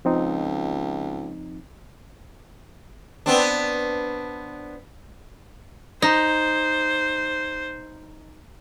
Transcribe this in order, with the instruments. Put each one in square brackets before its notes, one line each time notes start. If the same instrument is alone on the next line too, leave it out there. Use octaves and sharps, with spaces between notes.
[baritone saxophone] C#2 [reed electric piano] F3 C4 D#4
[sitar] B3 C4 D4
[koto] D#4 [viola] C5